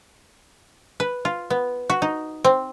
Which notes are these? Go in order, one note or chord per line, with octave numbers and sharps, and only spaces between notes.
B4
F4
B3
F#4
D#4
C4